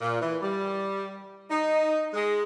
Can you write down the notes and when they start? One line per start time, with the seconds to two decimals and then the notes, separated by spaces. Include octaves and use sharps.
0.01 A#2
0.21 E3
0.42 G3
1.50 D#4
2.14 G#3